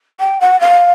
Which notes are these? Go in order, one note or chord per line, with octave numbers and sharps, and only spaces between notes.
G5
F#5
F5